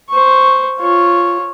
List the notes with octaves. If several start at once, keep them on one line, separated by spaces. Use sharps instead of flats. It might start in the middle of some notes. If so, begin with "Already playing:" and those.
C5 C#6
F4 C#5